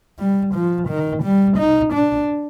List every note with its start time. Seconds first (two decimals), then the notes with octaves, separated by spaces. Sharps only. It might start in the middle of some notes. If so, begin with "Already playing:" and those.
0.19 G3
0.54 F3
0.88 D#3
1.23 G3
1.57 D#4
1.93 D4